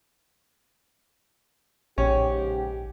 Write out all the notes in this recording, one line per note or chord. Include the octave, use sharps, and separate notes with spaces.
A#1 G#2 C#3 C#4 G4